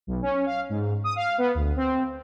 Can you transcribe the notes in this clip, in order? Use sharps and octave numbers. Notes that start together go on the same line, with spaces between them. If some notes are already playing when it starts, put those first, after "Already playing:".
B1
C#4
F5
G#2
D#6
F5
B3
D2
C4